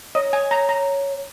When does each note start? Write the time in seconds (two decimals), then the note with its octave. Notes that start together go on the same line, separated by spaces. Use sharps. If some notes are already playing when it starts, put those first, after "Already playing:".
0.15 C#5 D#5
0.33 G#5
0.51 A#5
0.69 A#5